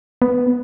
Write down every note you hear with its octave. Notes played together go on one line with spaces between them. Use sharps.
B3